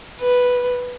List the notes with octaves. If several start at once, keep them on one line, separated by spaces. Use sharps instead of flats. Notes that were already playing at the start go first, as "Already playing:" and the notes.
B4